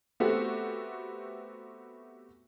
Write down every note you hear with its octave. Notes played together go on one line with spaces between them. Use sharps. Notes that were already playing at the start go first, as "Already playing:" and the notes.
A3 B3 C4 F#4 G4 A4